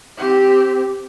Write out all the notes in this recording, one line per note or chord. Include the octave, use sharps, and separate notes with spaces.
C4 G4